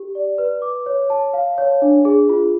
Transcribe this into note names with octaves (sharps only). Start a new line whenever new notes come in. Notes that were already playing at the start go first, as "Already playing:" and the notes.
Already playing: G4
D5
B4
D6
C#5
A5
F5
C#5
D4
G#4
F4